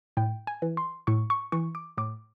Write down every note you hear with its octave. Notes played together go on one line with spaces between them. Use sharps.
A2 G5
G#5
E3
C6
A2 C#6
C#6
E3 C#6
D6
A2 D6